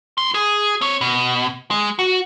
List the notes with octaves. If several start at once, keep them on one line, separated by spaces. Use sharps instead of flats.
A2 C6
G#4
C4 C#5
B2
G#3
F#4